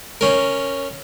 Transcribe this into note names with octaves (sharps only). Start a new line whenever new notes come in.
C#4 A#4